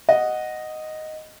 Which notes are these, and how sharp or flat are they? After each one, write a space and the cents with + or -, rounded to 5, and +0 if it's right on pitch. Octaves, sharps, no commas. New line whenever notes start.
D#5 +0 F#5 +0